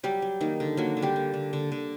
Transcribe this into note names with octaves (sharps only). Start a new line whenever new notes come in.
F#3 G3 G4
F#3
D#3 A#3 D#4
D3
F#3 A#3 F#4
D3
G3 G4
A#3
D3
D3
D3